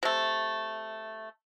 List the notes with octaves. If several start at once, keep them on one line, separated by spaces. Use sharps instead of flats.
C3 A3